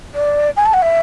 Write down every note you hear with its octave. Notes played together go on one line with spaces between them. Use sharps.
D5
G#5
A5
F#5
E5